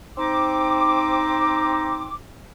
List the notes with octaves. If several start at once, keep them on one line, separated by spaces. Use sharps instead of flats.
C4 D#4 D6